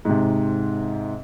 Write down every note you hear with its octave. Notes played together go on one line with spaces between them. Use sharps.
G#2 C3